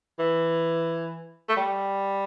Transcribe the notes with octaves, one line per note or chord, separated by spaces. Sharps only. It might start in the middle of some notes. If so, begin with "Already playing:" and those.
E3
A3
G3